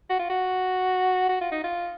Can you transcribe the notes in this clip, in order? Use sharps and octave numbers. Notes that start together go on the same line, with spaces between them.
F#4
F4
F#4
F#4
F4
D#4
F4